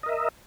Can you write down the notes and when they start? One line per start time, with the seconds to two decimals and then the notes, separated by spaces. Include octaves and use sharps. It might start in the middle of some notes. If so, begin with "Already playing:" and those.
0.03 D#5
0.06 A#4
0.09 E5